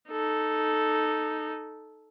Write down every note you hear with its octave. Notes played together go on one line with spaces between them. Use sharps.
D#4 A4